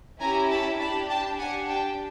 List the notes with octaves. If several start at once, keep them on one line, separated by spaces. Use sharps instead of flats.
C#4 E4 G4 G#5 A#5
A5 B5
D4 G4 A5 B5
G5 A5
D4 G4 F#5 G#5
G5 A5